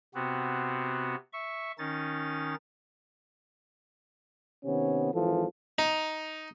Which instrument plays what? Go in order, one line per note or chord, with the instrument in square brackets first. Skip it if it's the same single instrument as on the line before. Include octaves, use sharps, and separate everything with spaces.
[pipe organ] C3 B3 C4 F#4
E5 C#6
D#3 C#4 D#4 A6
[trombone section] C3 D#3 B3 C#4
G#1 E3 F3 A4
[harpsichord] D#4